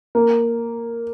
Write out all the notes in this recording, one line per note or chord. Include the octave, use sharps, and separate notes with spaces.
A#3